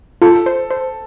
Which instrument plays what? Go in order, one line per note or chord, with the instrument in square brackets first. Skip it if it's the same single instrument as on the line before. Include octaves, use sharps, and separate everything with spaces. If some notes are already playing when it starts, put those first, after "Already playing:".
[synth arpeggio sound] F4 [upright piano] A4
[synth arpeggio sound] C5
C5